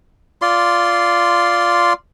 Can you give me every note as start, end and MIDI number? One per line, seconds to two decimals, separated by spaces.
0.42 1.93 65
0.42 1.93 74
0.42 1.93 84